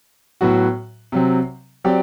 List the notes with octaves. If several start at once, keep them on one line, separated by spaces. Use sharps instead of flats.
A2 F#3 B3 F#4
C3 F#3 C4
F#3 C4 G4 D5